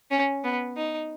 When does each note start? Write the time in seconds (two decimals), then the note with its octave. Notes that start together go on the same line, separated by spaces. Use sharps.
0.11 C#4
0.44 B3
0.76 D#4